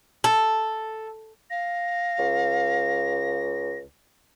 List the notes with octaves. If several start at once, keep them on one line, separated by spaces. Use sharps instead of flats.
A4
F5 A#6
C#2